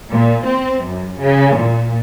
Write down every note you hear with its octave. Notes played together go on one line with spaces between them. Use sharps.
A#2
C4
F#2
C#3
A#2